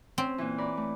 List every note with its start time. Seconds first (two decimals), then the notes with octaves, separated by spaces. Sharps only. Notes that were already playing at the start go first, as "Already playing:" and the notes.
0.18 C4 C#4
0.38 A#2 E3
0.58 A#4 D5 B5
0.77 A3